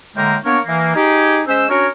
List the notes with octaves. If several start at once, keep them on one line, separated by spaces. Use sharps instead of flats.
A2 D3 G#3 A#3 G5 A#5
A#3 B3 D4 A#4 C#5
E3 A#3
D#4 G4 G#4
G#3 C#4 C5 E6
C#4 D4 F#4 A#4 C#5